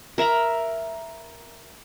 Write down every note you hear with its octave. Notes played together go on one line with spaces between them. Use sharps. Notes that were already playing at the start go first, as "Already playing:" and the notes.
A#4 E5 A#5 B5